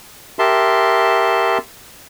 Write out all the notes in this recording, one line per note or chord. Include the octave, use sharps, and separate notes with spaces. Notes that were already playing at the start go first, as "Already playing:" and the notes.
G4 A#4 E5 A5 C6